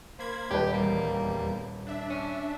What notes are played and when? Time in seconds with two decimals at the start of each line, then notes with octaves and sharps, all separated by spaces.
0.19 A#3 C5 B5 G#6
0.50 D#1 G#3 G4 B4
0.73 E2 G3 A#3
1.87 D4 E5
2.10 C#4